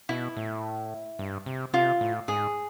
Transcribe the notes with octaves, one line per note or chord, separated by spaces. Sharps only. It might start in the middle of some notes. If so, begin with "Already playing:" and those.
B2 E4
A2
G2
C3
C3 F4
A2
G#2 G#4